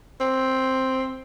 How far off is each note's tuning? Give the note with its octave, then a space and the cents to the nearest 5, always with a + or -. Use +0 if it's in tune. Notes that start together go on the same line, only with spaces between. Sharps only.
C4 +5